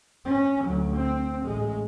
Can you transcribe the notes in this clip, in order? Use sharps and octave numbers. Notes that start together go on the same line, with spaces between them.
C#4
D2 F#3
C4
A1 G#3